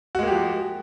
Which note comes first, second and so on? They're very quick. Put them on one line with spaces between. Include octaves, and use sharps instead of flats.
F#4 G#3 A#3 G4 F3